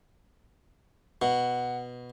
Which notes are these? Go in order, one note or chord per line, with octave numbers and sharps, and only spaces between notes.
B2 F#5